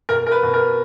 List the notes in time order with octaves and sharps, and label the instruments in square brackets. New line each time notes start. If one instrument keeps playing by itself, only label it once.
[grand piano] B2 A#4
A#4
B4
B2
A#4